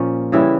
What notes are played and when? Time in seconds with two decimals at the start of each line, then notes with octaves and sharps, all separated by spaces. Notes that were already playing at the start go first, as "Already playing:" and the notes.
Already playing: A#2 F3 C#4
0.32 C#3 E3 G3 E4